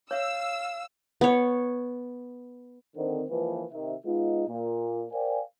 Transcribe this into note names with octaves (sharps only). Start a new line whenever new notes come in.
C#5 E5 F5 E6
B3 C#5
D3 D#3 C4
C#2 E3 F3 A#3 F4 B4
C3 D#3 E5
G#3 B3 D#4 F4
A#2
A#4 C5 D5 F5 G5 G#5